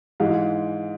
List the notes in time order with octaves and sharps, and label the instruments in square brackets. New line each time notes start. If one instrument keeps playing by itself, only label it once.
[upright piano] G#2 E3 G#3 F5